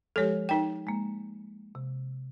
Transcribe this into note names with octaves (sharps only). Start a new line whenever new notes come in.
F3 G#3 G4 A4 C#5
D#4 G5
G#3 A#3
C3